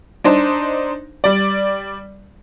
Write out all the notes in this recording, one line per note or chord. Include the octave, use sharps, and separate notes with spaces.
D4 D#4 C5
G3 D5